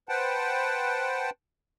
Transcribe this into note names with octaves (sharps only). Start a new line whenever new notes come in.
B4 C5 F#5 G5 A5